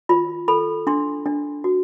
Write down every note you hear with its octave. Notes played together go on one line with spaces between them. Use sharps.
F4 B5
A4 B5
D4 C6
D4
F#4